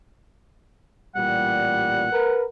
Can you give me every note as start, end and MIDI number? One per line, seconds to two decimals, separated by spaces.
1.16 2.06 33
1.16 2.06 46
1.16 2.06 55
1.16 2.46 78
2.12 2.43 70
2.12 2.43 71